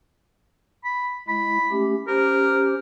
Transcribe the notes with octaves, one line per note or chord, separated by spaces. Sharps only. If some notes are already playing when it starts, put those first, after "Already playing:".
B5
G#3 E4 B5
A3 C#4 G4
C#4 G4 A#4 C5